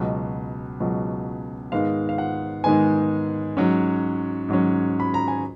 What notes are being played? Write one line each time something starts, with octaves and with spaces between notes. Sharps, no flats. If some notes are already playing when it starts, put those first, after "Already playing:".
Already playing: C#2 B2 F#3 D#5
C#2 B2 F#3
G#2 D#3 G#3 B3 F5
F5
F#5
G#2 D#3 G#3 B3 G#5
G#2 F#3 C#4
G#2 F#3 C#4
B5
A#5
G#5